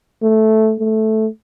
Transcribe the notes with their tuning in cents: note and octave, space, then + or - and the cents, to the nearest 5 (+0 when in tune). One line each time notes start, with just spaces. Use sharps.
A3 -5
A3 -5